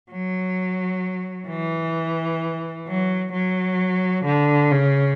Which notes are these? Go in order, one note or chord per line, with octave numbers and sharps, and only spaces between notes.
F#3
E3
F#3
F#3
D3
C#3